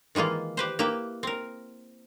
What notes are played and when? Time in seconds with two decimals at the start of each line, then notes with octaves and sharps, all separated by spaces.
0.15 D#3 E3 G#3 A#3 F4
0.57 G4 B4 C5
0.79 A#3 E4 G4 B4 E5
1.23 C4 A#4